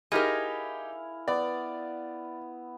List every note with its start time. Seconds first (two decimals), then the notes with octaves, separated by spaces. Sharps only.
0.12 D#4 E4 G4 G#4 A#4 F5
1.28 B3 D5